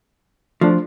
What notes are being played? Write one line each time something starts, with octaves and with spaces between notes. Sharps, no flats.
F3 A3 D4